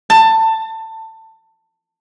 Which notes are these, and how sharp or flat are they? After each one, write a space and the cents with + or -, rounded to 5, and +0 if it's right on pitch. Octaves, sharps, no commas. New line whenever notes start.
A5 +20